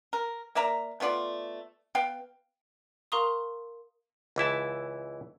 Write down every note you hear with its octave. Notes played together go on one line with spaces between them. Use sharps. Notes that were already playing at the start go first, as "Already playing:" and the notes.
A#4
A#3 D5 E5 A#5
A3 B3 F4 D5
B3 F5 G5
A#4 F5 A#5 C6 C#6 D#6
C#2 E3 E4 A5